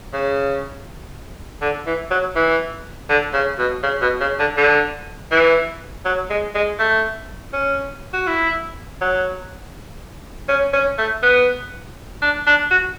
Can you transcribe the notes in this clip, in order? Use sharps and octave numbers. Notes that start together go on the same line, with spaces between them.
C#3
D3
E3
F#3
E3
D3
C#3
B2
C#3
B2
C#3
D3
D3
E3
F#3
G#3
G#3
A3
C#4
F#4
E4
F#3
C#4
C#4
A3
B3
D4
D4
F#4